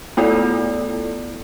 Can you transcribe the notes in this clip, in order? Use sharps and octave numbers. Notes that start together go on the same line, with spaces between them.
A3 B3 E4 F4 A4 D5